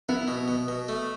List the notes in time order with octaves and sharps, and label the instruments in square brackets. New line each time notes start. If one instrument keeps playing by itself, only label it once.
[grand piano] B3 [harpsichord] E4
[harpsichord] B2
B2
B2
A3